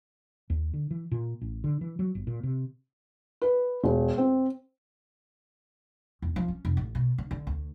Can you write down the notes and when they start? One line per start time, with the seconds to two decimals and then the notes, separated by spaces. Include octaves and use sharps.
0.50 D#2
0.74 D3
0.91 E3
1.12 A#2
1.41 A1
1.64 D3
1.81 E3
1.99 F#3
2.15 G1
2.27 A#2
2.43 C3
3.42 B4
3.84 E1
4.18 C4
6.22 E2
6.36 F3
6.48 C#4
6.65 F1
6.77 A1
6.95 B2
7.18 D3
7.31 D3
7.47 D2